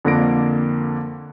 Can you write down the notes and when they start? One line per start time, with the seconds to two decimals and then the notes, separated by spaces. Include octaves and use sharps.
0.05 F2 D3 A#3 A#6 D7